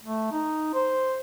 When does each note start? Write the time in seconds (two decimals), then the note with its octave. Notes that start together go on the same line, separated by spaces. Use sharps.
0.04 A3
0.32 D#4
0.74 C5